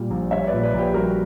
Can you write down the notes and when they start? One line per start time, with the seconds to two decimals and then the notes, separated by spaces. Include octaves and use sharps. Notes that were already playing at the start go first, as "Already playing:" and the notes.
Already playing: A#2 G3
0.11 A#1
0.31 G3 C#5 E5
0.47 A#2 B4 D5
0.63 B4 D5
0.74 A#1 G4 B4
0.94 G3 F#4 A#4